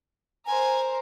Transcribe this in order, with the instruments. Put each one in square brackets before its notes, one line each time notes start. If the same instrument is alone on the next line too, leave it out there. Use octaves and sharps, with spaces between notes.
[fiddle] A#4 C5 [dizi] G#5